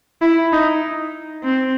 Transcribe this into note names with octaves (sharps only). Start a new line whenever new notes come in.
E4
D#4
C4